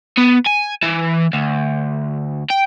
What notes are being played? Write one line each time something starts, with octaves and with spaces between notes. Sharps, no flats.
B3
G#5
E3
D2
G5